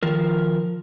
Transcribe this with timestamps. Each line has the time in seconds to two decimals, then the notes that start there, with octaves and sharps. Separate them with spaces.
0.03 D#3 F3 A#4